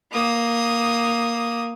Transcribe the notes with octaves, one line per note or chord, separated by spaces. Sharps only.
A#3 D#6